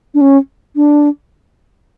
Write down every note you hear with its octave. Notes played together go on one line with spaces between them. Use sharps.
D4
C#4
D4